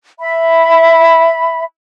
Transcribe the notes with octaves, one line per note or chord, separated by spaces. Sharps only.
E5 B5